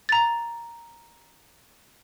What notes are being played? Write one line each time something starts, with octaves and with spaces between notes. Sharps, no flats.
A#5 A6